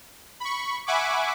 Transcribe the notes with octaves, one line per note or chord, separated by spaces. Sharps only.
B5 C#6
E5 F#5 G#5 B5 C#6 D6